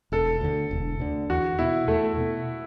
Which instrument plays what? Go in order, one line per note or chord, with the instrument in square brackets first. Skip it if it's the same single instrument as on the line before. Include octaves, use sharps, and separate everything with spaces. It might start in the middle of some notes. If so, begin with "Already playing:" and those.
[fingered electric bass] E1 [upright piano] A4
[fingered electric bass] D2 D3
E1
D2 D3
[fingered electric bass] E2 [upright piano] F#4
[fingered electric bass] B2 B3 [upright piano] E4
[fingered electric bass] E2 [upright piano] A3
[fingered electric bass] B2 B3